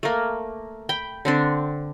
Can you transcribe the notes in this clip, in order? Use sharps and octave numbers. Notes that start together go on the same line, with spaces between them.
A3 A#3
G5 B5
D3 C4 D4